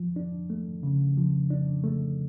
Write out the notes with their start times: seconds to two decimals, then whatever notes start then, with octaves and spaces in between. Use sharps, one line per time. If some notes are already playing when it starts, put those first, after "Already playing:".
Already playing: F3
0.16 D4
0.50 A3
0.83 C#3
1.17 F3
1.50 D4
1.84 A3